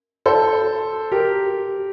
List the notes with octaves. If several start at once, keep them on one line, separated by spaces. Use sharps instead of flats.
A4 C5
G4 A#4